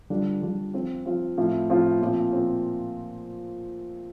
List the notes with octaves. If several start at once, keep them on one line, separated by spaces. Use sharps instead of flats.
D3 G3 D4 F4
D3 G3 D4 F4
F3 C4 F4
F3 C4 F4
A2 F3 C4 F4
A2 F3 C4 F4
A#2 F3 C4
F3 C4